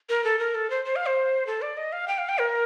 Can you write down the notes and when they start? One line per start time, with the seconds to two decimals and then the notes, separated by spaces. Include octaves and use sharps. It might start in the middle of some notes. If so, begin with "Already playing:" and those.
0.09 A#4
0.24 A4
0.39 A#4
0.55 A4
0.70 C5
0.85 C5
0.96 F5
1.06 C5
1.47 A4
1.62 D5
1.77 D#5
1.92 F5
2.08 G5
2.18 F5
2.29 G5
2.38 A#4